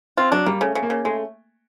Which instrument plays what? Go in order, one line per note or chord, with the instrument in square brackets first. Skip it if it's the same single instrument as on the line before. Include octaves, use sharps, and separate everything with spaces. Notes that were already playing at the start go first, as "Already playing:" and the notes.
[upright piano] C4 [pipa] F4
[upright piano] F#3 [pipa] D4
[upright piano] G3 [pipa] A#3
[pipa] C#3 [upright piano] A3
[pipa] C#3
[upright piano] A#3
[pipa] C#3
[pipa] G#3 [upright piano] A3